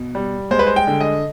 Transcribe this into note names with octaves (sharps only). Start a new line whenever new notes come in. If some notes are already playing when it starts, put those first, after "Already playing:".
Already playing: B2
G3
G#3 C5
B4
C5
G5
D3
D#5